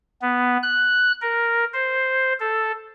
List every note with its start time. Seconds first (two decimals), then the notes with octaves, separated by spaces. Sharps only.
0.22 B3
0.63 F#6
1.21 A#4
1.74 C5
2.40 A4